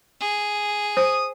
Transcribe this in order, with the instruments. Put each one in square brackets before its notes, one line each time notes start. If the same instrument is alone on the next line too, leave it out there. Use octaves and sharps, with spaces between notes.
[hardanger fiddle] G#4
[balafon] C5 [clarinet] D#6